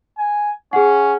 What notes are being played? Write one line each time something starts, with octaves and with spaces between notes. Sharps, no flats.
G#5
C#4 G#4 F#5